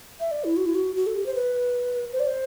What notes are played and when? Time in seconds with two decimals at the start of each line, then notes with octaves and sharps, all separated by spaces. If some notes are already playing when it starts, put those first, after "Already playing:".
0.20 E5
0.31 D5
0.44 E4
0.57 F#4
0.66 E4
0.75 F#4
0.96 F#4
1.06 A4
1.15 G4
1.26 C5
1.35 B4
2.13 C5
2.20 D5
2.27 C5